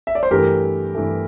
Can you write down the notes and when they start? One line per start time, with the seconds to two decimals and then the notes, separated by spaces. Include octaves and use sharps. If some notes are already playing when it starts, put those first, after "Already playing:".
0.07 E5
0.15 D5
0.23 C5
0.31 G2 E3 A3 G4 A#4
0.95 G2 E3 A3